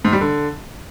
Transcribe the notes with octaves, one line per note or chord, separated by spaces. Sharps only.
G#2
G3
D3